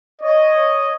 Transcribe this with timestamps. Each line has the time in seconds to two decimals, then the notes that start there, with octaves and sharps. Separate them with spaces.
0.21 C#5 D#5